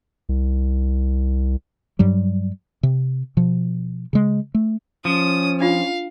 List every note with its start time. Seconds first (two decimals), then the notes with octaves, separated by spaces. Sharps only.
0.29 C2
1.99 G2 F#3 G3
2.83 C3
3.37 B2 F3
4.13 C#3 G#3
4.54 A3
5.05 F3 C#4 D#6
5.61 D4 F4 F5